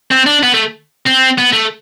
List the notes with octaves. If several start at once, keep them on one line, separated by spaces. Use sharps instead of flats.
C4
D4
B3
A3
C4
B3
A3